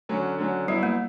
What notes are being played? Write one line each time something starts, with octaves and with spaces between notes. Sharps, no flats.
D3 F#3 C#4
D3 F#3 C#4
F#3 G3 B3 E4
A#3